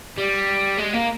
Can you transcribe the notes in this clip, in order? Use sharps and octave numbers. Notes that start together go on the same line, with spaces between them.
G3
G#3
A#3